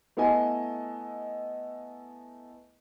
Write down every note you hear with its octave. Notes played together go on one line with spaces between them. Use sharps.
A3 B3 E4 D#5 G#5